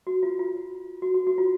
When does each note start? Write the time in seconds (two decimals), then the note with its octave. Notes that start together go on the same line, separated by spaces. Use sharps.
0.07 F#4
0.23 F4
0.39 F4
1.02 F#4
1.14 F#4
1.27 F#4
1.38 F4